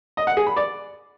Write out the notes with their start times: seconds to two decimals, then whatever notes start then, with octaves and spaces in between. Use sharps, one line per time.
0.17 D#5
0.27 F#5
0.37 G#4
0.47 B5
0.56 D5